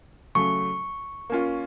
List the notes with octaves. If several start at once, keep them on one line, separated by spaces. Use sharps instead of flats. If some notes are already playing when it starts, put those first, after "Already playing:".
C#3 F#3 A3 C#6
A#3 C#4 F4